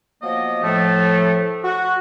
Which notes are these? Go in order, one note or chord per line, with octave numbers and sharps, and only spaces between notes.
F3 F#3 A#3 B3 D#5
A2 F3 A3
F#4